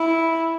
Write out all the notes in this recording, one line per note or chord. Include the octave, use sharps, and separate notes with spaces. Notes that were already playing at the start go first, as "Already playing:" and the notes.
Already playing: E4